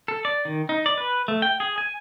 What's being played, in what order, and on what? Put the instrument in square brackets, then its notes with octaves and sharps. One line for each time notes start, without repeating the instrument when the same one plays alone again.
[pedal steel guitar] A4
D5
D#3
D#4
D5
B4
A3
G5
G#4
G#5